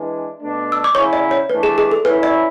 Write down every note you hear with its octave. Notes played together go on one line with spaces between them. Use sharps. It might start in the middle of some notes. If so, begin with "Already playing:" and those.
Already playing: E3 G#3 D4 B4
B2 A3 D4
E6
D6
C#3 F#3 C#4 E4 C#5 C#6
D5
C#5
E3 A3 D4 B4
G#4
G#4
A4
F#3 C#4 E4 B4
D5